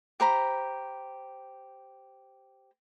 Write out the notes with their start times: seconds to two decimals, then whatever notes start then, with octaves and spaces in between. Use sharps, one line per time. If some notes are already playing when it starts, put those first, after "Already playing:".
0.20 G4 C5 A#5 B5